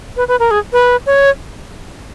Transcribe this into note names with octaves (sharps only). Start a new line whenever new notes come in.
B4
B4
A#4
G#4
B4
C#5